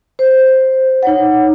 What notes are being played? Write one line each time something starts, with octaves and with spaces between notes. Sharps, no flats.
C5
D#4 C#5 F#5